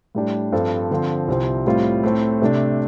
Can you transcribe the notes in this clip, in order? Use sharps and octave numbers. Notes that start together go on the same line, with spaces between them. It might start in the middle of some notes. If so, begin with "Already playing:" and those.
A2 G3 D4 G4
G2 F3 C4 A4
D3 F3 C4
C2 C3 F3 C4
A2 G3 C4 F4
A2 A3 C4 A4
C3 A3 D4